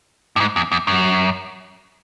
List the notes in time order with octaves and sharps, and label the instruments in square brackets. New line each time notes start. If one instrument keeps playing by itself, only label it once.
[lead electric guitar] G2
G#2
E2
E2
F#2